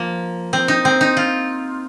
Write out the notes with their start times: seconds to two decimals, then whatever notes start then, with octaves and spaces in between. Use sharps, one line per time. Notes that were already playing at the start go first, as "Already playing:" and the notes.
Already playing: F3 A#3
0.53 C4
0.68 D#4
0.85 C4
1.01 D#4
1.17 F4